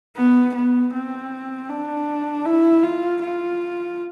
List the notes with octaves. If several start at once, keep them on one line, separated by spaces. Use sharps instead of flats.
B3
B3
C4
D4
E4
F4
F4